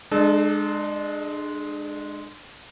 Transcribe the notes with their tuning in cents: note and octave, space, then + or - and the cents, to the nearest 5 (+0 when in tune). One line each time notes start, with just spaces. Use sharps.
G#3 +0 D4 +35 A4 -30